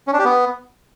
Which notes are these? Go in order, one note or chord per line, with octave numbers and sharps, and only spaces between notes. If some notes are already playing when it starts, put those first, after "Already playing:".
C#4
D4
G4
B3